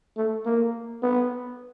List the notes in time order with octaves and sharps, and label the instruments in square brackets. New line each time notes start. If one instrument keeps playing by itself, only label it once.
[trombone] A3
A#3
B3